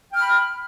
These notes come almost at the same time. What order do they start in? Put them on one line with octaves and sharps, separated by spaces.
G5 F6 B5